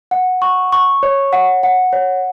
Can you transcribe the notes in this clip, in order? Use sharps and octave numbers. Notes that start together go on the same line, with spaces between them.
F#5
C#6
C#6
C#5
F#5
F#5
C#5